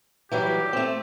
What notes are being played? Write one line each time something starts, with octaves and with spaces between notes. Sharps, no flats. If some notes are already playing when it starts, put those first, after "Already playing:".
E3 F#3 G3 G4
A3 C4